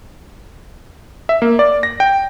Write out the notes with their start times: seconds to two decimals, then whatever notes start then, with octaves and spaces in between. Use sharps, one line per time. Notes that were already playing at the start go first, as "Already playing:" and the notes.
1.29 E5
1.42 A#3
1.59 D5
1.83 A#6
2.00 G5